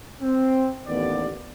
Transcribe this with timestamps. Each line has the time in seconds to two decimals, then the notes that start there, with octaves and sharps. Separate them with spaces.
0.21 C4
0.87 A1 D#2 B3 D5